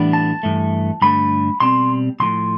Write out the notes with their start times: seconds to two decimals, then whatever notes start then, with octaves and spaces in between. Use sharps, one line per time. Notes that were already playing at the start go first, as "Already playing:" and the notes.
Already playing: A2 E3 G3 B3 D4
0.13 A5
0.43 G2 E3 A3
1.02 G2 D3 A3 B5
1.60 B2 G3 C4 C6
2.20 B1 A2 F3 C6